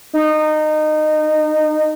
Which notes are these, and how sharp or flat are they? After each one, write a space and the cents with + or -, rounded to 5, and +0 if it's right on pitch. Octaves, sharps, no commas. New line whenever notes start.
D#4 -20